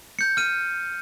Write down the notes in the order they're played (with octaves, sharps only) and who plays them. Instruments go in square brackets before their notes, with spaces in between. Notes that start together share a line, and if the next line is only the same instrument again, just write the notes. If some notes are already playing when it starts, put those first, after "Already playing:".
[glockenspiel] G6 C#7
F6 D#7